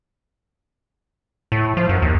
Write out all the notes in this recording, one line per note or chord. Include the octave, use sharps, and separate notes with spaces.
A2
F3
F#2
D#2